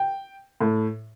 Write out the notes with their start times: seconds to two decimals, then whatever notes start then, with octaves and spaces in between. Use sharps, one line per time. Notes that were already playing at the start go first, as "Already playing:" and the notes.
Already playing: G5
0.61 A2